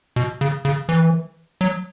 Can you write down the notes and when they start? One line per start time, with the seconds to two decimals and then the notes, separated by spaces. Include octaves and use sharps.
0.16 B2
0.41 C#3
0.65 C#3
0.89 E3
1.61 F#3